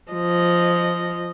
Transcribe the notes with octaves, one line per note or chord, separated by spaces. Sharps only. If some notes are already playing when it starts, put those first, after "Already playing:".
F3 D#5